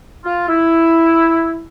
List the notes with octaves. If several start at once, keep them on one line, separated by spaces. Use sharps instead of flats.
F4
E4